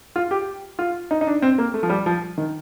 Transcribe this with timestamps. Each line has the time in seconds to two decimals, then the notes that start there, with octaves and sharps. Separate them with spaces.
0.16 F4
0.31 G4
0.79 F4
1.11 D#4
1.21 D#4
1.27 D4
1.42 C4
1.58 A#3
1.74 A3
1.83 F3
1.90 G3
2.06 F3
2.38 D#3